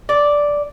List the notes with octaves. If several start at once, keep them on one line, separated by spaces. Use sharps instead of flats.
D5